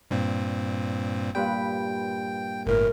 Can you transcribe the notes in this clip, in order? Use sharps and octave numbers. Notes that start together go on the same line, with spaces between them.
G2 A#2 C4
G2 A#2 B4 G5
G1 A2 A#4